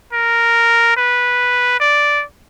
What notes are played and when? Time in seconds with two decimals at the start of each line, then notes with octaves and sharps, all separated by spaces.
0.13 A#4
0.97 B4
1.80 D5